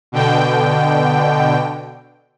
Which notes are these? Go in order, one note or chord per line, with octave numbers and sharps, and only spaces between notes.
B2 D3 G5